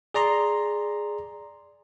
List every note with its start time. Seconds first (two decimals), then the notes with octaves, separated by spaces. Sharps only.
0.14 G#4 D5 A#5 C6